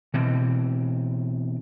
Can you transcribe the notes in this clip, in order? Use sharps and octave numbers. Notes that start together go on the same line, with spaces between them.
B2 E3 C4